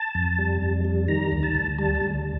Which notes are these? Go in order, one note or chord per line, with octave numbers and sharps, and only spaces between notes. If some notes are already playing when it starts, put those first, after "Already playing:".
Already playing: A5
F2
G3
F2
G3
D#3 A#5
D2
A5
D2
G3 A5
A5
D2